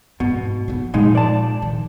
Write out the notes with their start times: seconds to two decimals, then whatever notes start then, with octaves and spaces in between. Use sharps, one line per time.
0.20 G#2 B2
0.68 A#3 B3
0.94 A#2 E3 F3 G#3 D#4
1.15 D5 A5
1.62 D#3